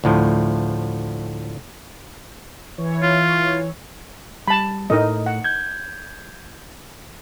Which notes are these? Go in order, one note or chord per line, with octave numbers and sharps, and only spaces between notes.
D2 A2 F3
E3 E4 C#5
F4
G3 A5 B5
A2 A3 D#4 A#4 D#5
F#5
G6 G#6